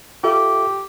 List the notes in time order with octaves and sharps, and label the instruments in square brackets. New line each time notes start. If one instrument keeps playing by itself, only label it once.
[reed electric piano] F4 A4 E5 [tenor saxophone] G4